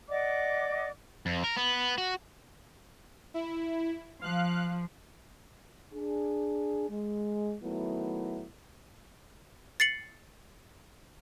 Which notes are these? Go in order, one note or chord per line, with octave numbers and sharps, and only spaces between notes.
D5 D#5 F#5 D6
F2
A#4
B3
F#4
E4
F3 F5 F#6
D4 G#4
G#3
D#3 F#3 A3 B3 E4
A6 C7 C#7 F#7